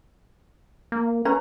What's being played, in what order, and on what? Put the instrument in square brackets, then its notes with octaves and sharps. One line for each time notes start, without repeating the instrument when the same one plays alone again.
[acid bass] A#3
[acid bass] C#4 [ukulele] B4 A#5